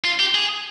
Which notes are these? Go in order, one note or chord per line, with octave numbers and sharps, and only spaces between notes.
F4
G4
G#4